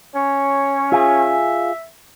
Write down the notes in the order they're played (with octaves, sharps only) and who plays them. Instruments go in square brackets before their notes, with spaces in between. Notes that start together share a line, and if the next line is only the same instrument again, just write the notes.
[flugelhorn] C#4 [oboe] C#5
[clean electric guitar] F4 G#4 [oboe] E5